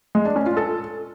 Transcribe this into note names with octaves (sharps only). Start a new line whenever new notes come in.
G#3
D4
C#4
F4
A4